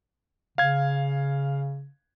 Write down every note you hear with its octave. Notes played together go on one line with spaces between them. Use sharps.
C#3 F5 G#6